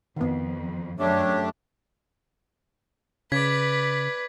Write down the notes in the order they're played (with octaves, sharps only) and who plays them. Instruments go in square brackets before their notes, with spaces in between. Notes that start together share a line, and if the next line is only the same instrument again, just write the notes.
[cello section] F2 [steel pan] D#3 B3
[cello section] F#2 [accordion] A3 D4 G4 [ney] C#5
[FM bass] C#3 [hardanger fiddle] B4 [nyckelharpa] D5 [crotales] G#6 B6